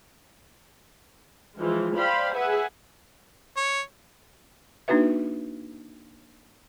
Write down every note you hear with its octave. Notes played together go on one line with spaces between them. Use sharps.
E3 F3 G#3
C5 D5 F5 G5 B5
G#4 B4 E5 F#5 G#5
C#5
A#3 D4 D#4 F#4 B4 E5